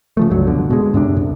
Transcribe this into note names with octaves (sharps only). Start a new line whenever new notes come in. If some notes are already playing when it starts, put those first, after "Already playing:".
C#3 F3 A3
F1 C#2 G2 F#3
B2 D3
B2 G#3
F#2 C3 D4
C2